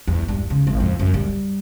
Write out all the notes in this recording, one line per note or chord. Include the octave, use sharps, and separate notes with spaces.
E2
G2
C#3
G#1
F2
F#2
G3